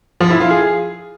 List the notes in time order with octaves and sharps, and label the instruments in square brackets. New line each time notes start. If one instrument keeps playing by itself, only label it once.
[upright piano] F3
E4
F4
G#4